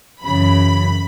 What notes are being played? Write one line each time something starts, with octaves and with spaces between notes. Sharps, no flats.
F#2 C#3 E3 B5